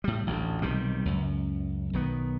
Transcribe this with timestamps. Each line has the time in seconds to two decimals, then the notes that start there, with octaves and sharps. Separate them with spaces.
0.04 A2 G3
0.27 A1 D2
0.62 B1 C3 D#3 G3
1.05 C#2 F#2
1.93 B1 D#3 B3